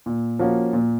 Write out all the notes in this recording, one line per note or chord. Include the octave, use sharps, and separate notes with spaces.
A#2
F3 A#3 C#4 F#4
A#2